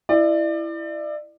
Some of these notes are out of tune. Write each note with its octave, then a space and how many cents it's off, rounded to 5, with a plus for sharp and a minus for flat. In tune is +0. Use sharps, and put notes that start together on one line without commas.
E4 +10 D5 +30